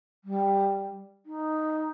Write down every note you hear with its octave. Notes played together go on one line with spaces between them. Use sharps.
G3
D#4